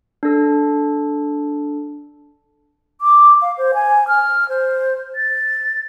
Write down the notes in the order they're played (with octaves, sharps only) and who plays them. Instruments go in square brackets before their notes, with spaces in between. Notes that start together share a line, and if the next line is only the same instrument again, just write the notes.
[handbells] D4 A4
[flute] D6
F5
C5
G#5
F6
C5
A6